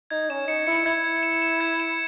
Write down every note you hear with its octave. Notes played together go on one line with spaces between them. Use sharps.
D#4 G#6
C#4 E7
D#4 C#7
E4 C#7
E4 G#6
G#6
E7
E7
G#6
E7